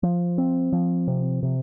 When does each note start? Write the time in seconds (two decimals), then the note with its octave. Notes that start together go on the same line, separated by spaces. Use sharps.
0.03 F3
0.38 C4
0.73 F3
1.08 C3
1.43 C3